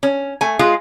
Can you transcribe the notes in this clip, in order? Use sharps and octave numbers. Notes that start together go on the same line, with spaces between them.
C#4
A3 G#5
G#3 F4 G#4